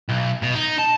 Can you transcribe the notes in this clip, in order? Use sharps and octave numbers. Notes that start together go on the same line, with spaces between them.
B1
B2
D#4
A5